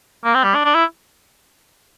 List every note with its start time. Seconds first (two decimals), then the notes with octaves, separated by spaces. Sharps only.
0.24 A#3
0.34 C4
0.44 G3
0.55 D4
0.65 D4
0.75 E4